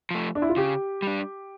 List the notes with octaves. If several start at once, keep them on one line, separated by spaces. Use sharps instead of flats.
F3 A3
D4
E4
F4
C#3 G4
G3 D4